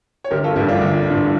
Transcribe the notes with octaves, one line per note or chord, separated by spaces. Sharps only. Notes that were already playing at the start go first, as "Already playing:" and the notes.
C#5
G1 G4 A#4
F4 A4
G2 E3 E4 G4
D4 F4
G1
G2 E3